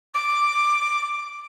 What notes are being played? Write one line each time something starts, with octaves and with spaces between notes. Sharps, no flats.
D6